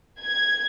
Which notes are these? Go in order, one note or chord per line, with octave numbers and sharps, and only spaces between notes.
G#6